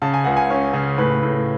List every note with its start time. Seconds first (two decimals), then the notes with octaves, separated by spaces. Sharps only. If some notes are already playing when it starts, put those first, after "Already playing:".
0.02 C#3 A5
0.14 G#5
0.24 C#2 F#5
0.37 G#5
0.50 C#4
0.74 C#3
0.98 A2 B4
1.23 A2